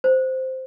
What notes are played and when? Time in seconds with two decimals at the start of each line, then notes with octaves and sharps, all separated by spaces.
0.04 C5